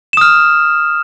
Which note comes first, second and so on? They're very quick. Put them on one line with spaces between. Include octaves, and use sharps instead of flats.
E7 D#6 F6